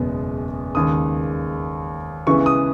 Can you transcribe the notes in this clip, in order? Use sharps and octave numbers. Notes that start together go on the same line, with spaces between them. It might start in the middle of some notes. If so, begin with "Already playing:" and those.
Already playing: F#1 E2 B2 G#3 B3
D#2 C#3 G#3 D#6
C#2 C#3 E3 B3 C#6
D#6